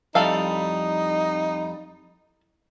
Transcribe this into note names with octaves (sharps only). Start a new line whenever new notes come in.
F2 G3 D#4 E4 A4 F5